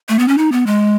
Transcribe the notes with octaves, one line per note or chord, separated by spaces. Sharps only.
A3
B3
C#4
D#4
B3
G#3